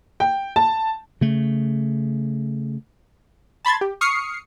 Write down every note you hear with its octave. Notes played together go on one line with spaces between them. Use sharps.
G5
A5
C#3 A3
A5 B5 C6 G#6 A6
G4
C#6 D#6 F6 C7 C#7